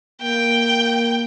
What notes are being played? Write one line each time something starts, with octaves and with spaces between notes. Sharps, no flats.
A#3 G5